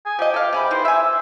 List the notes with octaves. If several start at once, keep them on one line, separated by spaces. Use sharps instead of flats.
G#5
F3 G4 D#5
A4 F5
C3 G#4 B5
E3 D#4 C5
E5 G#5 E6